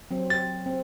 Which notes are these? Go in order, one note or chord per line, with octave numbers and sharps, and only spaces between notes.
F#3 C4
A6
C4